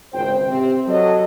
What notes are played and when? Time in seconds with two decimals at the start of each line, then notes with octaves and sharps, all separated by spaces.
0.13 G#1 C#2 C5 G5
0.47 C3 C4
0.87 F#3 A4 D#5